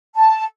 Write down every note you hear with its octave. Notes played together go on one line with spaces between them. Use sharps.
A5